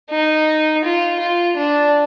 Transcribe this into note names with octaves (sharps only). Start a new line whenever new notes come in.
D#4
F4
F4
D4